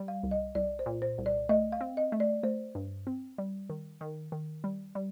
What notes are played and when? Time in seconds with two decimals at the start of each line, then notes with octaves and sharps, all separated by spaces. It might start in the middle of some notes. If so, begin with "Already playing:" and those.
Already playing: G3
0.08 F5
0.23 C2
0.31 D#5
0.55 C2 D5
0.79 C5
0.86 A#2
1.02 C5
1.18 C2
1.26 D5
1.49 A3 D#5
1.72 F5
1.81 C4
1.97 D#5
2.12 A3
2.20 D5
2.43 A3 C5
2.75 G2
3.07 C4
3.38 G3
3.70 D#3
4.01 D#3
4.32 D#3
4.64 G3
4.95 G3